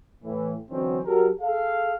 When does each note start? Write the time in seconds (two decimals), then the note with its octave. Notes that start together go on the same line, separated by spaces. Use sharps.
0.24 A2 E3
0.70 D3 E3 F#3 C4 C#4 D#4
1.05 F#3 F#4 G4 A4 A#4
1.41 G#4 A4 F5